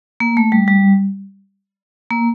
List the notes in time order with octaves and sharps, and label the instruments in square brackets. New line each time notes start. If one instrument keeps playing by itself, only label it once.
[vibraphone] A#3
A3
G3
G3
A#3